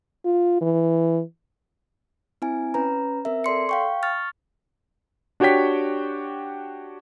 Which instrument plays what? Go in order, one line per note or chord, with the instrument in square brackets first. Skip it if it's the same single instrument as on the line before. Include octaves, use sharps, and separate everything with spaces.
[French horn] F4
E3
[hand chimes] C4 E4 G#5
C#4 B4 A#5
C4 A#4 E5
A4 D5 C6 C#7
F5 G5 C#6
C#6 F6 A6
[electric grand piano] D4 F#4 G4 C#5 G5 B6